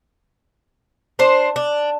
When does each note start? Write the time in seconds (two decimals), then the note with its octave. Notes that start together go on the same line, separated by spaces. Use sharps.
1.19 D4 C5
1.56 D4